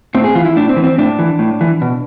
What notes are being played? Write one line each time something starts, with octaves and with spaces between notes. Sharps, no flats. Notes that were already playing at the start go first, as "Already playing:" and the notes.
A2 C4
G#4
E3 F4
E4
A2 D4
C4
E3
C4
A2 D4
E3
A2
E3
B2